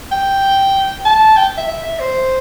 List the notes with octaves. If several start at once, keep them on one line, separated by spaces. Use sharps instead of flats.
G5
A5
G5
E5
E5
E5
C5